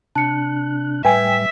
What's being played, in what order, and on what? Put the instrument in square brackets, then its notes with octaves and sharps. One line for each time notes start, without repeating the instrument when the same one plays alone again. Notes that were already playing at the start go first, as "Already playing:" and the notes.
[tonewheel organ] C3 D4 F#6 [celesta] A5 C#7
[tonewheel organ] A2 G3 [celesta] B4 [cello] E5 [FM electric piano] G5 G#5